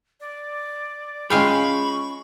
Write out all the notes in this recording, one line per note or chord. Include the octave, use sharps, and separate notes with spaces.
D5
G#3 C#4 F4 G#4 F5 G5 B5 C#6